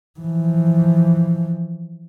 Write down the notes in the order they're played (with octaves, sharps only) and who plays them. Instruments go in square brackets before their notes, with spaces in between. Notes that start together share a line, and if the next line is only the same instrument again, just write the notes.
[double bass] E3 F3